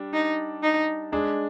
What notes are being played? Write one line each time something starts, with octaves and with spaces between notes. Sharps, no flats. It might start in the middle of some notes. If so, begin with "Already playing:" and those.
Already playing: G3 D4
D#4
D#4
G#3 D4 G#4